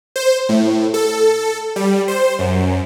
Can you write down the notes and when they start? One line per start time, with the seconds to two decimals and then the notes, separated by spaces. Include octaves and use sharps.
0.16 C5
0.49 A2
0.94 A4
1.76 G3
2.08 C5
2.39 F#2